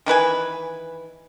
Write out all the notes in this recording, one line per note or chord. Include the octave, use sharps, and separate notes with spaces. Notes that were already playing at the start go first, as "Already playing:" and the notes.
D#3 E3 B4 G#5